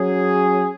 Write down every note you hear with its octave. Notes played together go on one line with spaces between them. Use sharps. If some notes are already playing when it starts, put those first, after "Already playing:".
Already playing: F#3 C#4 G#4